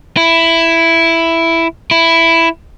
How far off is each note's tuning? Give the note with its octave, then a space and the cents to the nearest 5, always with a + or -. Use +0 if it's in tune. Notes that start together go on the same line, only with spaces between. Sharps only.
E4 +5
E4 +5